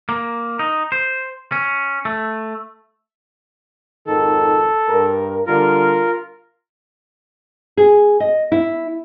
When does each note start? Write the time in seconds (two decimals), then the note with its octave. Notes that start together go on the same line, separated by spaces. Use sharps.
0.09 A#3
0.59 D#4
0.92 C5
1.52 C#4
2.05 A3
4.07 F2 G#2 D#3 A4
4.88 G2 A#4
5.47 D3 G3 F4 A#4
7.77 G#4
8.20 D#5
8.52 E4